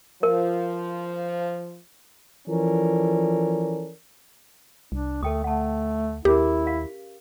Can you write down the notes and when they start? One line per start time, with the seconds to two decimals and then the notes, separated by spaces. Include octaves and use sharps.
0.23 F3 A#4
2.48 E3 F3 C#4 A4 A#4 D5
4.92 C2 D4
5.23 D2 A3 A4 G5 D#6
5.44 A3 F#5 A5
6.25 D#2 C#4 E4 G4 G#4 A#4
6.67 F5